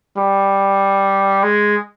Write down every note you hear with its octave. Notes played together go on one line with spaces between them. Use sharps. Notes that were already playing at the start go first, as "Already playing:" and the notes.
G3
G#3